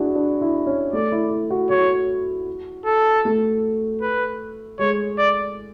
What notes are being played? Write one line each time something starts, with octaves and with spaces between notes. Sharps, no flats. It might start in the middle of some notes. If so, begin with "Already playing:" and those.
Already playing: D4 E4 F#4 G#4
D4
E4
C#4
A3 D5
E4
E4
F#4
F#4 C#5
A4
A3
B4
G#3 C#5
D5